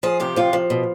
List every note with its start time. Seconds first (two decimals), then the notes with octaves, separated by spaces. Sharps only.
0.03 F3 G#4
0.20 C3 G4
0.36 F3 F4
0.53 F3
0.70 B2